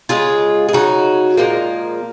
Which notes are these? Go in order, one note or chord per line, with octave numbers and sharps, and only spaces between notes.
C#3 G#3 F4 G#4
G#4
C#3 F#3 D#4 F#4
A#2 F3 G#3 A#3